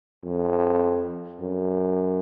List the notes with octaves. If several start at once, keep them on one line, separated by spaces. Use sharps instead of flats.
F2
F#2